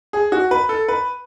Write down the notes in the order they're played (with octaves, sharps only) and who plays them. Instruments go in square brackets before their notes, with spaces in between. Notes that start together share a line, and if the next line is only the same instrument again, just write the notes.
[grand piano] G#4
F#4
B4
A4
B4